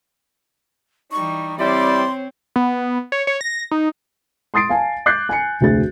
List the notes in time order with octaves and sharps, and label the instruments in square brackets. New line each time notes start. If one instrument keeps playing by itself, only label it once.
[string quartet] E3 G3 D#4 [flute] C#6
[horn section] G3 E4 D5 [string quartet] C4 C#5 [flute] C6
[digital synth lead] B3
C#5
C#5
A#6
D#4
[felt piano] C6 D#6 A6 C7 D7
F5 G#5 A5
D6 F#6 G6 A6 C7
G#5 C#7
F1 D2 D4 F#4 G#4 A6